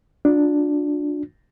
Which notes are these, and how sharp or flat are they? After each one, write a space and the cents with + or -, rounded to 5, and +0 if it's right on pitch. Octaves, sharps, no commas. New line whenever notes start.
D4 +0 F4 +45